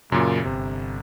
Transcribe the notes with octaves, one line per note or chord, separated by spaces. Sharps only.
F#2 A#2 C#3
G1 C3